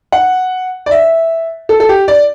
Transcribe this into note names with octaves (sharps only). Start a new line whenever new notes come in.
F#5
D5
E5
A4
A4
G4
D5